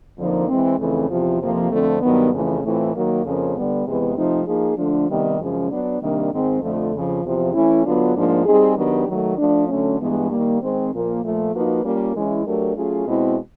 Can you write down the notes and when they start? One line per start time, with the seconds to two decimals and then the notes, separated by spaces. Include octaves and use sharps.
0.17 F2 D3 F3 A#3 D#4
0.48 E3 G#3 C4
0.79 F2 C#3 E3 A3 C4
1.10 E2 C3 F3
1.40 F2 C3 F3 A#3
1.71 F2 D3 F3 A3 C4
2.02 G2 D#3 F#3 B3
2.32 F2 C#3 E3 A3
2.63 A2 E3 A3 C4 F4
2.94 D#3 F#3 A#3
3.25 F2 C#3 F3 A#3 C#4
3.55 D3 G3 B3
3.86 E2 C3 E3 G#3 B3
4.16 C3 F3 A3 C4 D#4
4.47 F3 A#3 D#4 G#4
4.77 D3 F3 A3 D4
5.08 C3 D#3 G3 B3 D#4
5.39 F#2 C#3 F3 G#3 C#4
5.70 F#3 B3 D4
6.01 C3 D#3 G3 A#3 D4
6.31 G#2 D#3 G#3 C4
6.61 F2 D3 F3 A3
6.93 F2 C#3 F3
7.24 E2 C3 F3
7.53 E3 A3 C#4 E4
7.84 D3 F#3 B3 D4 F4
8.16 G#2 F3 A#3 D4
8.46 G3 C4 D#4 G#4
8.76 D#3 F#3 B3 D4 G4
9.08 D#3 F#3 A3
9.38 F3 A3 D4
9.69 D3 F#3 A3 C#4
9.99 G2 E3 G#3 B3
10.30 D#3 G3 A#3
10.61 D#3 G#3 C4
10.91 A#2 F3 A#3
11.22 A#2 F3 A3
11.53 F3 A#3 D#4 F#4 B4
11.84 G3 A#3 C#4 F4 A#4
12.14 E3 G#3 C#4 E4
12.45 F#3 A3 D4 G4 A#4
12.76 F#3 A3 C#4 F4 G#4
13.07 B2 G#3 C4 E4